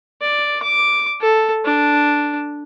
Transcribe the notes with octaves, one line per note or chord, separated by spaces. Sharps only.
D5
D6
A4
D4